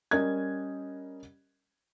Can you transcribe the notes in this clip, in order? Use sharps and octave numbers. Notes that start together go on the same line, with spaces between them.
G3 C#4 A#4 D#5 G#6